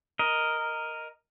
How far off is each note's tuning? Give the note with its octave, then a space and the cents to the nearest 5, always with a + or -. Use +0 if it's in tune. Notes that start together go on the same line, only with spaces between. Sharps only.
A#4 +0 D#5 +0